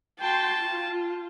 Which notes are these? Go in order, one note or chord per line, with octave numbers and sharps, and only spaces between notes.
F#4 G5 A5 C6
F4